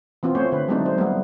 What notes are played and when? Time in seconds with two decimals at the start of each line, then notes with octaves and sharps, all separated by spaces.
0.23 E3 B3 C4 F4
0.35 A3 C#4 C5 C#5
0.52 D3 B4
0.68 F#3 G#3 A3 C4 D4 D#4
0.85 F#3 D#4 C5
0.98 G3 A3 B3